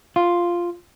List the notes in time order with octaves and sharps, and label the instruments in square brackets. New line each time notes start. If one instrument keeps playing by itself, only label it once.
[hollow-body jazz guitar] F4